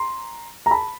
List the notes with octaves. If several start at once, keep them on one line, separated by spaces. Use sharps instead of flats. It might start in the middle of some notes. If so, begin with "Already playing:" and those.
Already playing: A#5 C6
A#5
A5 B5